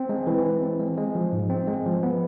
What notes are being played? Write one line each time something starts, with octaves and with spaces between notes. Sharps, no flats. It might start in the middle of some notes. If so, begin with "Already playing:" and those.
Already playing: C4
G#3
E3
E3
C4
G#3
G#3
F3
G#2
C4
G#3
F3
B3